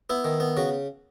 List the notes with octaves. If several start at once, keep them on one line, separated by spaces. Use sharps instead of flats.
B3 E4
D#3
B3
C#3 F#4